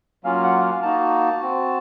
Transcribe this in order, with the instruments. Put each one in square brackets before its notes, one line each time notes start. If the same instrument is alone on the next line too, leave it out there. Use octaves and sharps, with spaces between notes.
[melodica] F#3 A#3 C#4 F4 F5
F#5
F5
A#3 D#4 F#4 A5
C4 F#4